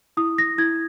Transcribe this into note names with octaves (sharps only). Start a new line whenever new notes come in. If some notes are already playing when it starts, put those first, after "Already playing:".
E4 D#6
A#6
E4 G#6